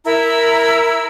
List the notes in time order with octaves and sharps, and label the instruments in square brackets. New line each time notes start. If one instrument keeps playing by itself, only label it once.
[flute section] E4 A#4 A#5 E6